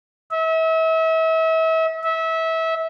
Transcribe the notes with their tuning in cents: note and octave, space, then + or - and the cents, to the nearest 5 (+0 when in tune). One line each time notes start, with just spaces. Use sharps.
E5 -35
E5 -25